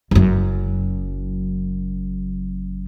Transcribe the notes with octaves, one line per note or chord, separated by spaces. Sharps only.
F#1 F#2